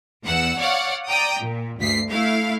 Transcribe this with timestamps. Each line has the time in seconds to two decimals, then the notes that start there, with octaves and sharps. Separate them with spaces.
0.24 E2 F#5 E6
0.58 C#5 D5 F5 F#5
1.09 D5 G5 A#5 D#6
1.41 A#2
1.79 D2 G2 B6 C7
2.10 A3 E4 F5